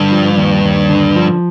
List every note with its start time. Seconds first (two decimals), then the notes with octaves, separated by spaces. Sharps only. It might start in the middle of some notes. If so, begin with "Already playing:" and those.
Already playing: G2 D3
0.11 F3
0.38 D#2
0.65 D#2
0.89 D3
1.16 F3